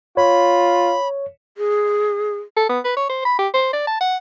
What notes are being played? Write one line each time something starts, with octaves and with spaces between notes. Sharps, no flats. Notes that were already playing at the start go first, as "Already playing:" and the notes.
F4 C#5 B5
G#4
A4
B3
B4
C#5
C5
B5
G4
C5
D5
A5
F#5